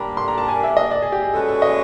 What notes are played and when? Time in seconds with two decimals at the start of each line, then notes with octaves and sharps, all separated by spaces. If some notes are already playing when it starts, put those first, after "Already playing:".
Already playing: G3 A#3 D4 A#5 B5
0.17 C6
0.28 A#5
0.38 A5
0.48 G#5
0.63 E5
0.77 D#5
0.91 D5
1.02 G#4
1.12 G4
1.23 G#4
1.34 G#3 C#4 F#4 A4 B4 D5
1.49 A4
1.62 D#5